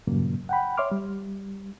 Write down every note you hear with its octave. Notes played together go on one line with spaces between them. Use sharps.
E2 G2 A#2 C#3 F#3 A#3
F#5 G5 B5
C#5 E5 C6 D6 F6
G3